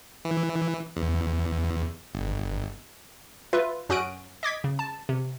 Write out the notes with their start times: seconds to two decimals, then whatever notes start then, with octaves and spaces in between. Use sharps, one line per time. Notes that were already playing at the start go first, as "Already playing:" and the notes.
0.25 E3
0.96 E2
2.14 G1
3.53 F4 B4 E5
3.89 F#2 C#4 F#4 D#6 F#6 D7
4.43 D#5 D6 G#6 B6
4.64 C#3
4.79 A5
5.09 C3